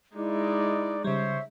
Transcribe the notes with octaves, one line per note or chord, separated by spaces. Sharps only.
G#3 D#4 E4 D5
C#3 G3 C5 C#5 E5